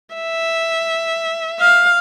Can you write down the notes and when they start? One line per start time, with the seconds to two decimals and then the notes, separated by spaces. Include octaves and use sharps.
0.15 E5
1.60 F5